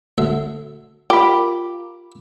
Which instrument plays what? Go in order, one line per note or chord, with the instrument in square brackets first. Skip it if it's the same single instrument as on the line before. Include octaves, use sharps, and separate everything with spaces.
[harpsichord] D2 E5
[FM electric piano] F4 A#4 [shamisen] G4 [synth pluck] B5 D6